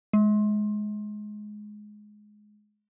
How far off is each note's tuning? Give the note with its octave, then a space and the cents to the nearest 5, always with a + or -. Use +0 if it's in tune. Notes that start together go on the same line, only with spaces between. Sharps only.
G#3 +15